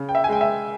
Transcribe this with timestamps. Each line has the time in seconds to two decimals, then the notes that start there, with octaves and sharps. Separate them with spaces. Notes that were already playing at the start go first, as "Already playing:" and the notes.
Already playing: C#3
0.09 G5
0.15 E5
0.24 G#5
0.29 G#3 G5
0.41 E5